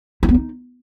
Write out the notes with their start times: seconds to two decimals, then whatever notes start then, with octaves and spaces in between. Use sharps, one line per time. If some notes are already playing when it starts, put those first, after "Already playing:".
0.23 E4
0.29 B3
0.34 D#4